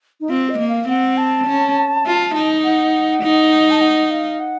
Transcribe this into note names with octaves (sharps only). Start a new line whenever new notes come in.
D#4
C4 F4
D#5
A#3
F5
C4 F#5
A5
C#4
F4
D#4
F#5
D#4
A5
F#5
F5
F#5